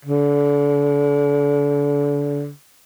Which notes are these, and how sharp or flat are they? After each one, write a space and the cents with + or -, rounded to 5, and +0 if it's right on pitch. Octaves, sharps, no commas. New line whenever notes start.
D3 -35